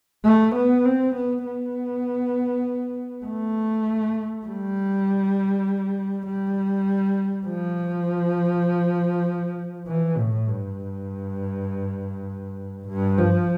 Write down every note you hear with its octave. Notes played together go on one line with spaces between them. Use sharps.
A3
B3
C4
B3
B3
A3
G3
G3
F3
E3
A2
G2
G2
F3